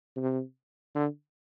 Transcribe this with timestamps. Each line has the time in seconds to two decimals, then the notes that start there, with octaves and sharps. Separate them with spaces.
0.17 C3
0.95 D3